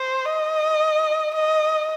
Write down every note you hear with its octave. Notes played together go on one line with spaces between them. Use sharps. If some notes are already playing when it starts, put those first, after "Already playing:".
Already playing: C5
D#5
D#5